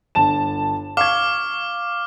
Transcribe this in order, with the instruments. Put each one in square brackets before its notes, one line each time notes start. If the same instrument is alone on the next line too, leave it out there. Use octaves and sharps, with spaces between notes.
[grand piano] G1 A5 E7
[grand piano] F5 C#6 G#6 [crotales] D6 F6